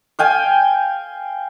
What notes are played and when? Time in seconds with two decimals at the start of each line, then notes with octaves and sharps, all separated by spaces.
0.19 F5 G5 G#5